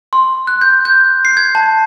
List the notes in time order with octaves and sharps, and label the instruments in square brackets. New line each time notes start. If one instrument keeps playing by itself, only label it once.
[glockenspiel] C6
F#6
G6
G6
C7
G#6
A5